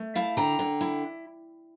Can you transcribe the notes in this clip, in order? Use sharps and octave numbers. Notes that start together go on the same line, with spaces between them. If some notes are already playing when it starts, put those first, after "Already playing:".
Already playing: A3
E4 F5 A5
D3 G5 A#5
D3
E4